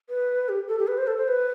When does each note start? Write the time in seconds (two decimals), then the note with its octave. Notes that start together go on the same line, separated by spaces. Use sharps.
0.09 B4
0.49 G4
0.68 A4
0.79 G4
0.87 B4
0.98 C5
1.07 A4
1.17 C5
1.28 B4